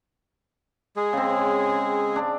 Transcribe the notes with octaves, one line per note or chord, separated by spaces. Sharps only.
G#3 G#4
C#3 C4
D4